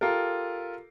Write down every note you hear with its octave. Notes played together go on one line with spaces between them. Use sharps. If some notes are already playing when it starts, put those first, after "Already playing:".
F4 G4 A4 A#4